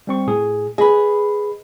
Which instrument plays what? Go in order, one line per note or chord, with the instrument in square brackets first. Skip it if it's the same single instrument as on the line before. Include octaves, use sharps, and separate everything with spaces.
[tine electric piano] G3 C4 C#6
A2 G#4
[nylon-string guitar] G#4 B4 [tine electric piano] D#5 B5